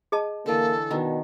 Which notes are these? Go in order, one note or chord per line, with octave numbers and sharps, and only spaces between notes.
G#4 D#5 A5
D3 E3 A#3 A4
B2 D#3 B3 D4